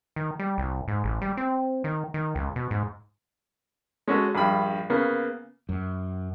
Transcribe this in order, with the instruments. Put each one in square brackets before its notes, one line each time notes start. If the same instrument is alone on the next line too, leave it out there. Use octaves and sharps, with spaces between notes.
[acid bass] D#3
G3
C2
G#2
A1
G3
C4
D#3
D#3
C#2
B2
G#2
[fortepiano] G#3 C#4 F#4 A4
A#1 G2 B5
C#3 A#3 B3
[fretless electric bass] F#2